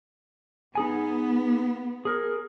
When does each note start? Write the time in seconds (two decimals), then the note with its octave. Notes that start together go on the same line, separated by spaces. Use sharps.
0.75 B3 D#4 G#4 G#5
2.05 G#4 A#4